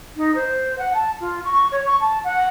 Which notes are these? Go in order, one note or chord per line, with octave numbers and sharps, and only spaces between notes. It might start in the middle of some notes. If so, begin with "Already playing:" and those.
D#4
C5
F#5
A5
F4
C#6
C#5
C#6
A5
F#5